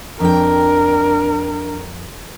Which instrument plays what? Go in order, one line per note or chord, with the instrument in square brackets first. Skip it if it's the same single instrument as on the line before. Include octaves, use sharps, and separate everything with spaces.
[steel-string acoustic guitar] F2 G5 [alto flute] D4 [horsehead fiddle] A#4